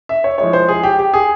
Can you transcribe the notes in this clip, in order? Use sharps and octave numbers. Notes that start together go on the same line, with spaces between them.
E5
C#5
F3 G#3 E4 C#5
C5
G#4
G4
G4
G#4